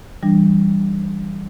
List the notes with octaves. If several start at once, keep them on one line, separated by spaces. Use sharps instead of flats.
E3 G3 D4